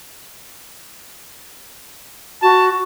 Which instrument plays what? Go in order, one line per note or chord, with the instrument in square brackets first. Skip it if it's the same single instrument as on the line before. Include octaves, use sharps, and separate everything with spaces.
[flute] F#4 [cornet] A5